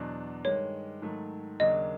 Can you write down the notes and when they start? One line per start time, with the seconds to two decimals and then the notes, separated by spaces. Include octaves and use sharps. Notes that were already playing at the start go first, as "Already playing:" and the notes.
Already playing: E2 B2 F#3 B3 D4
0.45 G2 D#3 G#3 C#5
1.02 G#2 D#3 F#3 A3
1.60 D#2 C#3 F#3 A#3 D4 D#5